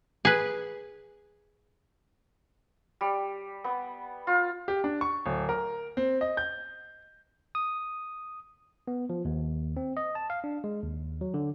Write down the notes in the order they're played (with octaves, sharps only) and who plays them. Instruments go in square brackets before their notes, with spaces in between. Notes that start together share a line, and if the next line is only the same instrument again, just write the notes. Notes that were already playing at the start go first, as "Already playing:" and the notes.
[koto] G#4 B4
[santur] G3
B3
F4
[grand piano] G4
D4
C#6
D1
A#4
C4
D#5
G6
[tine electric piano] D#6
B3
F3
D#2
C4
D#5
A5
F5
D4
G#3
D#2
F#3
D3